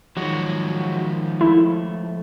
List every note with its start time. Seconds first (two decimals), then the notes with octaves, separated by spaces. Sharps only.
0.17 D#3 F3 F#3 G#3 F#4
1.41 A3 E4